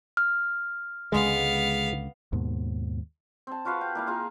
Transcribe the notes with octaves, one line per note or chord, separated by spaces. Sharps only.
F6
C#2 D3 G#3 B3 F5
D#2 G#2 B2
C4 A5
F4 F#4 B4 F5
G5
A#3 E4 F5
A#3 F4 G#4